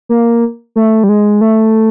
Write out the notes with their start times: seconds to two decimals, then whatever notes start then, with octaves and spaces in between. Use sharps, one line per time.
0.09 A#3
0.76 A3
1.04 G3
1.09 G#3
1.41 A3